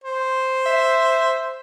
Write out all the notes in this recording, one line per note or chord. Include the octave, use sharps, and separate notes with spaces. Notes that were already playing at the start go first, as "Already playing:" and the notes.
C5
E5